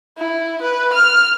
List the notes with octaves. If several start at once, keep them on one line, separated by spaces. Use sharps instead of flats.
E4
B4
F6